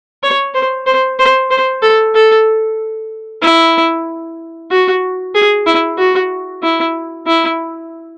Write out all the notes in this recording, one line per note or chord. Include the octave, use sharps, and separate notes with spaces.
C#5
C5
C5
C5
C5
A4
A4
E4
F#4
G#4
E4
F#4
E4
E4